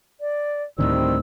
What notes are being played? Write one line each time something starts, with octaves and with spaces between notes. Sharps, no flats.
D5
D2 A2 D3 D#3 G3 C4 E6